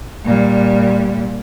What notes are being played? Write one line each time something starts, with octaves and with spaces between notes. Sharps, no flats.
A#2 G3